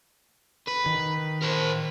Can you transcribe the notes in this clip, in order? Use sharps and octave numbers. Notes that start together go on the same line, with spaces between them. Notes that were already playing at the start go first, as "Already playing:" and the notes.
B4
D#3
A#4 C5